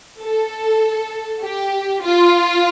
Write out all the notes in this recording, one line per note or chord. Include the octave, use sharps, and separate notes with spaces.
A4
G4
F4